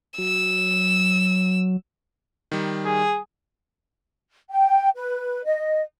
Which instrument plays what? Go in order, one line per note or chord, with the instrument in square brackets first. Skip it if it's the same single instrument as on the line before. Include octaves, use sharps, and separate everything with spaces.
[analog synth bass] F#3 [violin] E6
[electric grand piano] D#3 G3
[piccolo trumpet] G#4
[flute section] G5
B4
D#5